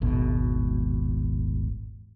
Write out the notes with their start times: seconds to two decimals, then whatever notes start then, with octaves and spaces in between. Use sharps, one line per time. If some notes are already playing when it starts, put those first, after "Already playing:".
0.01 D#1 G#1 B2